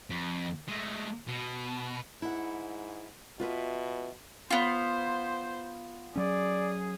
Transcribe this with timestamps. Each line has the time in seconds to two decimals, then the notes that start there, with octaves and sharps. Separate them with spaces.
0.10 F2
0.68 G#3 A3
1.28 B2
2.22 G#2 E4 F#5
3.40 B2 F4 B4 E5
4.50 B3 F4 C5
6.16 F#3 C#4 G#4 D5